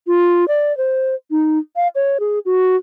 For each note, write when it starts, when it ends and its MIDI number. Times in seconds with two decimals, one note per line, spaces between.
0.07 0.48 65
0.48 0.75 74
0.77 1.15 72
1.31 1.59 63
1.76 1.88 77
1.95 2.18 73
2.20 2.39 68
2.46 2.76 66